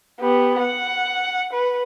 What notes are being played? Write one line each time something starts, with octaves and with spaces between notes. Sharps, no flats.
B3 G4
F#5
B4